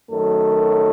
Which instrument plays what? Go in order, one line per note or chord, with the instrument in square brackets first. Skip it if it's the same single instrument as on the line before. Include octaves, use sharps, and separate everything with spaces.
[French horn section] F#2 D#3 F#3 A3 A4